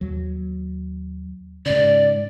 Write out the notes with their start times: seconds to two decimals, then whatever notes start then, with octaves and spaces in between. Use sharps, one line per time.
0.01 D#2 F#3
1.66 G#2 C#3 D5